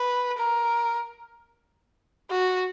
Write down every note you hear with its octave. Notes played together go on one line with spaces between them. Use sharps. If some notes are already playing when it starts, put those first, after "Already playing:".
Already playing: B4
A#4
F#4